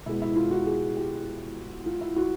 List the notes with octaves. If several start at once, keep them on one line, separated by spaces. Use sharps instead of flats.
B2 G#3 B3 E4
E4
F4
F#4
G#4
G4
F4
E4
F#4